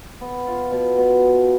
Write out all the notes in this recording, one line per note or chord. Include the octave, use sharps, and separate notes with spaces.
B3
F4
B2
B2